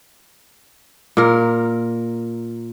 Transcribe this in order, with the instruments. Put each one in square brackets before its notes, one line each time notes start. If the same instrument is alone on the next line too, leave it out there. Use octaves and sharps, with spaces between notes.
[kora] A#2 A#4